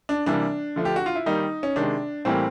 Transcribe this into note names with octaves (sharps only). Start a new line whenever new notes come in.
D4
C3 E3 G3 A#3 D4
D3 F3 A3
G4
F#4
F4
E4
D#3 G3 A#3 D#4
C#4
C3 D#3 G#3 D4
A2 E3 G3 A#3 C4